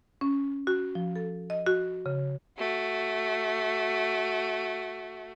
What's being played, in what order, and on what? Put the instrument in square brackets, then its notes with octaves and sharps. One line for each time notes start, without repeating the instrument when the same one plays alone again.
[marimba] C#4
F#4
F3
A4
D#5
F#4
C#3
[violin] A3 F#4